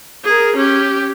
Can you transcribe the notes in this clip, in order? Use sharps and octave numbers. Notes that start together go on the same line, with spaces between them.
G#4 A#4
C#4 G4